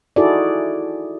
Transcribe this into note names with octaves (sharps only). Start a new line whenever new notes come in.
D#4 E4 F#4 G#4 A4 D5